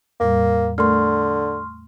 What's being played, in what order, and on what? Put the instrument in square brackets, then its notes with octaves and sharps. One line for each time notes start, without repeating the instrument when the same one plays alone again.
[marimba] E2 A2 G3 [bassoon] A#3
[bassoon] D3 [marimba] A3 A#4 [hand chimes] C6 C#6 F6